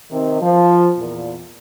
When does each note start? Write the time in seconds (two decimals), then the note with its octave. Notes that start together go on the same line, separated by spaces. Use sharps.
0.10 C3 D#3
0.41 F3
0.98 E2 A#2